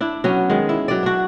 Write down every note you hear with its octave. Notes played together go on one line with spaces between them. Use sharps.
D4 E4
F#3 B3 C#4
D#3 G#3
E4
F#3 D5
D4 F#4